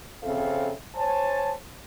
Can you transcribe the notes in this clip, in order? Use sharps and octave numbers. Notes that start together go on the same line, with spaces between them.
F2 C#3 C4 A4 E5 F5
C5 C#5 G#5 A5